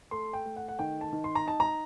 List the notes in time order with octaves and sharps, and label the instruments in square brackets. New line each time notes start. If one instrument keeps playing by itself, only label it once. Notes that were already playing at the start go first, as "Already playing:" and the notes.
[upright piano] A3 C6
G5
A3
F#5
F#5
D#3 G5
A5
D#3
C6
A#5
D#4 A5
A#5